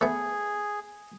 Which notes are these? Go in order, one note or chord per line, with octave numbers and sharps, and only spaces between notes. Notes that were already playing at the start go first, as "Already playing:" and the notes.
A3 B3 G#4